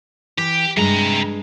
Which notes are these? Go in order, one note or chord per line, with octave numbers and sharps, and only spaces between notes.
E3 G4
G2 C3 G#3 A#5